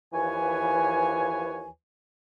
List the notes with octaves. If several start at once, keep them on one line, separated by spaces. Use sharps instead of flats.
D#2 E3 F3 B4 C#5 G#5